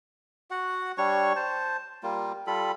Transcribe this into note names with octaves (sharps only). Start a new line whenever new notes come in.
F#4 F#5
G3 D4 C#5 C#6
C5 A5
G3 A#3 F4
G3 F4 A4 B5